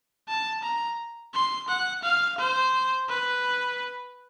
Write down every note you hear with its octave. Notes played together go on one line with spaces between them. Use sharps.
A5
A#5
C6
F#5
F5
C5
B4